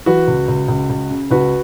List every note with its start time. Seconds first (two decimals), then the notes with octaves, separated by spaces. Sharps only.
0.06 E3 F#4 B4
0.28 C#2
0.48 C#2
0.68 C#2
0.90 C#2
1.11 C#3
1.31 C#2 F#4 B4